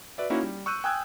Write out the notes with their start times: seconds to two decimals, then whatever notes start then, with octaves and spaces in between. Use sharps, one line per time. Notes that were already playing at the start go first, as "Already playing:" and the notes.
0.18 F#4 B4 D5 E5
0.30 A#3 C#4 D#4 E4 F#4
0.43 G3
0.66 C#6 E6 F#6 G6 D#7
0.84 G5 G#5 D#6 E6 F#6 G#6